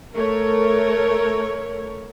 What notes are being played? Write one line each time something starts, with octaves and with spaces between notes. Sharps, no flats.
A3 A#4 C#5